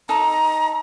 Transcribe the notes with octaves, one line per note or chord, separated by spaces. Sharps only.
D#4 A4 A#5